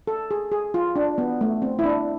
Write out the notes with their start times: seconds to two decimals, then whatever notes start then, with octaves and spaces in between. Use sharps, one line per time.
0.07 A4
0.31 G#4
0.52 G#4
0.74 F4
0.96 D4
1.18 B3
1.41 A3
1.62 C4
1.79 E4
1.84 D4